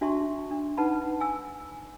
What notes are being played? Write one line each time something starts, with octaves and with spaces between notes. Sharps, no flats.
D4 F#4 E5 A5 C6 C#6
D4
D#4 B4 F#5 A5 B5
G#5 E6